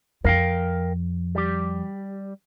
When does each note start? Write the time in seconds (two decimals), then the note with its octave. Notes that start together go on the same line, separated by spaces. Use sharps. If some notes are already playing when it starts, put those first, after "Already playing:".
0.24 F2 A#4 F5 G5
1.35 G3 G4